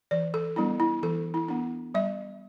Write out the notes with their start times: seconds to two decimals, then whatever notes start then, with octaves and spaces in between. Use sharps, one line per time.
0.11 E3 D5
0.34 A4
0.56 G3 B3 D4 E4
0.80 E4
1.03 E3 A4
1.34 E4
1.48 B3 D4
1.94 G3 E5